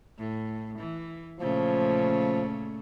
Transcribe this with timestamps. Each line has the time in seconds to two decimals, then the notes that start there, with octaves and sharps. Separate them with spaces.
0.18 A2
0.78 E3
1.40 A#2 C#3 F3 A3